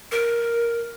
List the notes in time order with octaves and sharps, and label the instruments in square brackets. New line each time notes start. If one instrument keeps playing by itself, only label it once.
[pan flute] A#4